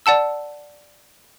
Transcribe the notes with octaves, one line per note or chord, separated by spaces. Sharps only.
D5 F#5 A5 E6